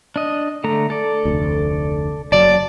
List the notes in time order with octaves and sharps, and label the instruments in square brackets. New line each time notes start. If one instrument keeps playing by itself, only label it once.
[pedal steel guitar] D4 D#5
D3 A3 A#5
A4 D5
[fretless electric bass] F1 D2
[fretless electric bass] F#1 F#3 [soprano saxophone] D5 [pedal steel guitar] A5